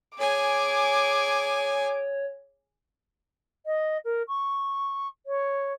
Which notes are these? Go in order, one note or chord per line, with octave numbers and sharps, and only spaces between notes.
G#4 C#5 G#5 D6
D#5
A#4
C#6
C#5